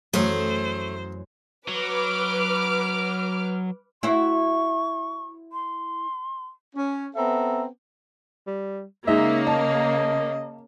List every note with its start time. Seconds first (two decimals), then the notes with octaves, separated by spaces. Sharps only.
0.14 F#2 E3 F#3 A3 C#4 G#4 C5
1.68 F#3 B4 D6 F6
4.03 E4 F#4 C5 C#6
5.53 C6
6.76 C#4
7.16 B3 C4 A4 E5 A#5
8.47 G3
9.08 C#3 G#3 A#3 D#4 E5
9.47 D#5 A5